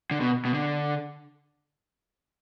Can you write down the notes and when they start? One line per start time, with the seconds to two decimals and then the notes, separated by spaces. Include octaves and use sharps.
0.11 D3
0.21 B2
0.45 B2
0.54 D3